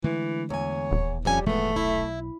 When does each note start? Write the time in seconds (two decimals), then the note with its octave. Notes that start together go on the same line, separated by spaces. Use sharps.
0.04 D3 E3 G#3 A3
0.50 E2 C#5 G#5
0.91 D#1
1.25 F2 G3 C#4 G#5
1.46 G#2 E3 F3 G#3 A3 B3
1.76 B1 E4